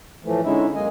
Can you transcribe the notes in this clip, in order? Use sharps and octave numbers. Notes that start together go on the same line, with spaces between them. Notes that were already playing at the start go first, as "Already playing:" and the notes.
A2 E3 F3 A3
D3 G#3 C#4 D#4 E4 E5
F#2 G#3 A#3 D#5 G#5